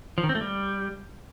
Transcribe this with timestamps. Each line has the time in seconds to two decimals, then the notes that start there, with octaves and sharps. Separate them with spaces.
0.18 F3
0.23 D#3
0.29 C4
0.35 A3
0.41 G3